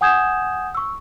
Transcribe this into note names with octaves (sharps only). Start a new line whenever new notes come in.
F#5 G#5 D#6 G6 G#6 E7
C#6 E6